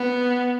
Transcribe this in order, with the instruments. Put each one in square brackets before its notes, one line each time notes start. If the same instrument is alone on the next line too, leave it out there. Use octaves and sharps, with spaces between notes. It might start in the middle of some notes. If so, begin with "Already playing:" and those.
Already playing: [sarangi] B3